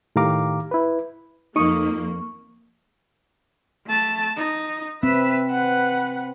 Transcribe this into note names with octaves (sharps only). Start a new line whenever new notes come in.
A2 D#3 G4 F5 A#5 D6
E4 B4
F2 A#3 D#4 C#6 D#6
A3 A5
D#4
C4 B4 E5
B4 F#5